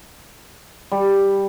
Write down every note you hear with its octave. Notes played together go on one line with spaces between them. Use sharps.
G3